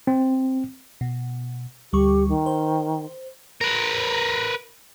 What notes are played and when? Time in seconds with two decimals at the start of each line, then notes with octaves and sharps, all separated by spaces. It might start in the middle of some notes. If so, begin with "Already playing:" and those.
0.07 C4
1.01 B2
1.93 D2 G3 G4 C#6
2.28 D#3
2.46 C5
3.61 A#4 B4